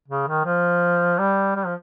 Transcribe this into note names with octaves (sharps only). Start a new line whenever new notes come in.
C#3
D#3
F3
G3
G3
F3